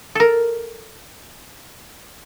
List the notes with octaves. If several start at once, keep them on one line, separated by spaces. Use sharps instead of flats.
A4 A#4